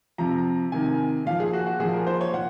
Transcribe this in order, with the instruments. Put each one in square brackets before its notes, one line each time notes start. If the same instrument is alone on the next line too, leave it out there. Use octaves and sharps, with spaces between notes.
[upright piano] C3 F3 A#5
C3 D#3 G#5
A#2 F3 F5
G#4
F#4
F#4
A#2 F3 G#4
A#4
C5
C#5
A#2 F#5